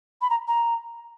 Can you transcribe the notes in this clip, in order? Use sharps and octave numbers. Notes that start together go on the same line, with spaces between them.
B5
A#5
A#5